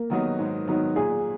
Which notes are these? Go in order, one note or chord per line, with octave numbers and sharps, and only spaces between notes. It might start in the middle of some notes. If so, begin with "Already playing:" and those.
Already playing: A#3
D#3 F#3 B3 D#4
G#2
D#3 F#3 B3 D#4
A#2 G#4